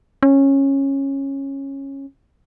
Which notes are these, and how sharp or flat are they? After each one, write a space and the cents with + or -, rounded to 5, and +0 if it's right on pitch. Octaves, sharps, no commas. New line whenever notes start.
C#4 -15